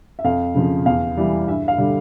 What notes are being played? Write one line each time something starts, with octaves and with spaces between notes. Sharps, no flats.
E5
F2 F5
C#3 F3
E2 F5
E3 G3
G2 E5
F5
D3 G3